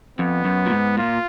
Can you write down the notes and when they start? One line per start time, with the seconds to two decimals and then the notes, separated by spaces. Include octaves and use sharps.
0.18 F2 B3
0.45 F#2
0.66 A#2
0.71 G#2
0.97 A#2 F4